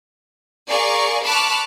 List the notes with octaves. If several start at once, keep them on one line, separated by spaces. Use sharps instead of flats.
G#4 A#4 D5 F5 C#6
A5 B5 C#6 D6 F6 F#6